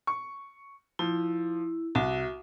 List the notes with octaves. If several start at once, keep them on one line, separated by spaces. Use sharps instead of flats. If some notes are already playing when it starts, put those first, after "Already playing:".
C#6
F3 E4
C2 F#4